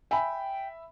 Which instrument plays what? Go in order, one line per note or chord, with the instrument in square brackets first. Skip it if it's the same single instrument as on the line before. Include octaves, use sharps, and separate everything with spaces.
[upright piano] E5 B5 [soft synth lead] G5 [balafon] G#5